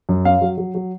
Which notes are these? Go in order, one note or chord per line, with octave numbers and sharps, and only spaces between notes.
F#2
C#4 F5
F#3
F#3
F#3